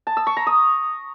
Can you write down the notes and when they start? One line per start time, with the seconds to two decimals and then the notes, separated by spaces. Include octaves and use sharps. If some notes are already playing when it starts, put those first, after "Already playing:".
0.07 A5
0.17 E6
0.27 C#6
0.37 A#5
0.47 D#6